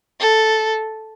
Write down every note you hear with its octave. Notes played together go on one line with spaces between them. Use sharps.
A4